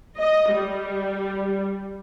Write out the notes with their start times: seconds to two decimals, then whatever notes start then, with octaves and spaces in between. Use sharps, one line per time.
0.18 D#5
0.52 G3